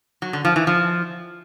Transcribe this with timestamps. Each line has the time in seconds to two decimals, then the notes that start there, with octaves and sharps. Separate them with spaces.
0.22 F#3
0.33 D3
0.45 F3
0.56 E3
0.67 F3